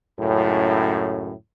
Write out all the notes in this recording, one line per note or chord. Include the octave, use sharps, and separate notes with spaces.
C#2 F#2 A2